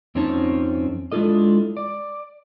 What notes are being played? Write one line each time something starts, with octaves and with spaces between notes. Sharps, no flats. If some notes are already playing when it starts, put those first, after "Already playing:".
F2 C4 C#4 D#4 C#5 A5
G#3 D4 E4 F4 A4 D#5
D5